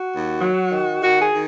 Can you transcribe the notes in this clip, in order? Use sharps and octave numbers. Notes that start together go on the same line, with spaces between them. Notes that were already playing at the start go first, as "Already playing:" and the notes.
Already playing: F#4
D#2
F#3
D#3
D#3 F#4
G#4
D#3